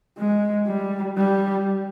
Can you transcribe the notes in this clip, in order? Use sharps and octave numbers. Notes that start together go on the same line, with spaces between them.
G#3
G3
G3